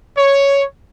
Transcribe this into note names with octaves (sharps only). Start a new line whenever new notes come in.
C#5